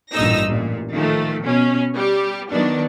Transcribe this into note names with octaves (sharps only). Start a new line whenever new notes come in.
A1 G2 A#2 D#4 E6 A#6
A1 A#2
D#3 F3 A3
B2 C#4
G3 G4
D#3 F#3 B3 D4